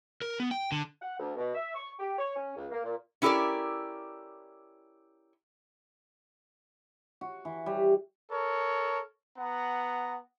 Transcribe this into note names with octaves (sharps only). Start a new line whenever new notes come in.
A#4
B3
G5
D3
F#5
D2
B2
E5
C#6
G4
C#5
C#4
C#2
A#3
A#2
C#4 E4 G4 A4 A#4 D5
F#4
E3
G3
A4 A#4 C#5
B3 F#5 A#5